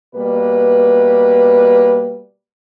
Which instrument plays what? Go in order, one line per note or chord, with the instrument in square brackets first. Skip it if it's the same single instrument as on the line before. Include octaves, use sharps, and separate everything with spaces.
[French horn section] B2 G3 A#3 B4